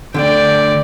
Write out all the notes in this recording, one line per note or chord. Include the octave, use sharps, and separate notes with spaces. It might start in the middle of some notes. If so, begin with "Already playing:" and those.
D2 G2 D3 D5 G5